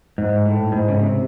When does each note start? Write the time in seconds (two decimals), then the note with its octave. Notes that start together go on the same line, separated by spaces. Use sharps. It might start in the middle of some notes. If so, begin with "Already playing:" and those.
0.18 G#2
0.45 A2
0.72 G#2
0.88 C#3
0.99 C3